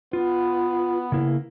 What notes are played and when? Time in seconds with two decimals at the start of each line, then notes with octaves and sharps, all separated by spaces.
0.13 B3 F4
1.12 C#3 A#3 E4